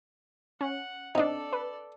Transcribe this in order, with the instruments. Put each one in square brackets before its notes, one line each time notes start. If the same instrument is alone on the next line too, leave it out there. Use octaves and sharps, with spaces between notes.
[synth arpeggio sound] C#4 [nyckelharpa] F#5
[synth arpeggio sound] C4 D4 [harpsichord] D#4 D#5 [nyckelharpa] A4 D5
[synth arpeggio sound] B4